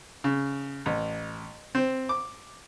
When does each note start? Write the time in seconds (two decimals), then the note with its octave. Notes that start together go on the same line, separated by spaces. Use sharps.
0.24 C#3
0.86 A1
1.75 C4
2.09 D6